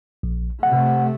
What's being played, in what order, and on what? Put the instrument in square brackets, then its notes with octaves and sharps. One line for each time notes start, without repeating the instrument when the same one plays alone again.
[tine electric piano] A#1
[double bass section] C3 A3 [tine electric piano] F#5